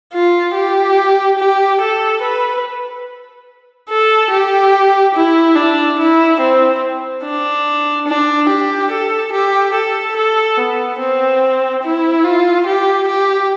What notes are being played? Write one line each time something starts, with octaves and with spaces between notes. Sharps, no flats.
F4
G4
G4
A4
B4
A4
G4
E4
D4
E4
C4
D4
D4
G4
A4
G4
A4
A4
B3
C4
E4
F4
G4
G4